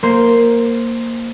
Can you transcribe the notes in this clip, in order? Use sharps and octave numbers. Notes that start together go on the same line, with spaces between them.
A#3 C5